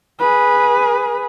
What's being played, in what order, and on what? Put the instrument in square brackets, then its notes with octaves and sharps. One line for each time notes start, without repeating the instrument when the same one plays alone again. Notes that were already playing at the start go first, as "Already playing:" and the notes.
[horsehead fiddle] G#4 B4